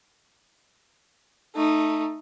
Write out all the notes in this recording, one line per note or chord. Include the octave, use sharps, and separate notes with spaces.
A3 D#4